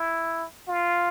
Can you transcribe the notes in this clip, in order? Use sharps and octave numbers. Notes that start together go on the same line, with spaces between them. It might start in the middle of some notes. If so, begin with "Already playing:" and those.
Already playing: E4
F4